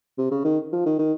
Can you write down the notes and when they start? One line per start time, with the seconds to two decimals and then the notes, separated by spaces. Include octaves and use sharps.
0.18 C3
0.31 C#3
0.44 D#3
0.72 F3
0.86 D#3
0.99 D#3